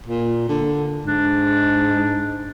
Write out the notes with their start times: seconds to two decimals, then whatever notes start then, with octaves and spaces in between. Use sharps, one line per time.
0.06 A#2
0.49 D3
1.05 G#2 D4